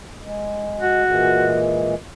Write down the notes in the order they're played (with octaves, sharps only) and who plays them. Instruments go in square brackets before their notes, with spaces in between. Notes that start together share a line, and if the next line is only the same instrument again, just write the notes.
[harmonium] G#3
[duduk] F#4
[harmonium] A#2 E3 G#3